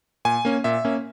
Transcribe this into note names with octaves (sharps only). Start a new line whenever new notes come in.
A#2 G#5
A#3 C#4
A#2 E5
A#3 C#4